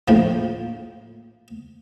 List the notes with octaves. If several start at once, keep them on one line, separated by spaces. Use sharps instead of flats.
A#1 A2 F3